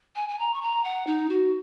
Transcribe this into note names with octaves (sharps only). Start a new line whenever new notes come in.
G#5
G#5
A#5
C#6
A#5
F#5
D#4
F#4